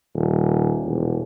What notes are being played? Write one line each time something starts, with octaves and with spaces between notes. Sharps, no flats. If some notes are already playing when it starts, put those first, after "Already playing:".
D#1
E1